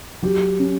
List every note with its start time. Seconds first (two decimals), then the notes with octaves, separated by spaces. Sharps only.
0.22 F#3 G4
0.59 C#4